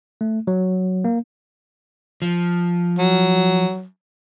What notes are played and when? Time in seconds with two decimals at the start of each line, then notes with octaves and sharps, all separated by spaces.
0.21 A3
0.47 F#3
1.04 A#3
2.22 F3
2.98 F#3